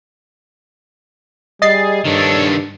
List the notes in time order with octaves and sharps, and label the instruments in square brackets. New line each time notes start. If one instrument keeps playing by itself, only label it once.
[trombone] G3 [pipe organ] G#4 [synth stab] D#5 A6 C7
[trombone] G2 [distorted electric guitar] D#3 D4 [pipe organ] A4 C#5